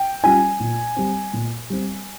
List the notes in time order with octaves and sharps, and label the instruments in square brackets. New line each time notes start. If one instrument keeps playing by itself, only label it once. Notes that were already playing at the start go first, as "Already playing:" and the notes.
Already playing: [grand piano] G5
G3 C#4 F4 G#5
A#2
G3 C4
A#2
G3 C4